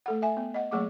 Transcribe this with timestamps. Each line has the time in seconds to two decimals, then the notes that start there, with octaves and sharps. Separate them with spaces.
0.06 A3 A4 F#5
0.22 E5 G#5
0.37 B3
0.54 D#5 F#5
0.71 F#3 A3 A#3 G#4 F#5 D6